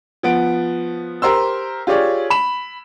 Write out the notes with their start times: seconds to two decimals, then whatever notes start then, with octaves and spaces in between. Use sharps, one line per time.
0.23 F3 B3 D7
1.22 G4 A#4 C5 C6 E6
1.87 F4 G4 G#4 C#5 D5
2.30 B5 E7